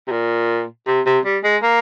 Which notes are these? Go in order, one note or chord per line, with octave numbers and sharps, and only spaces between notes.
C3
A#2
C3
C3
G3
G#3
A#3